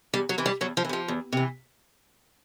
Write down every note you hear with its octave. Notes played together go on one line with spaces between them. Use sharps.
E2 G3
F#3
C3 E3
G3
E2 F#3
F3
E3
C3 F3
E2
C3 E3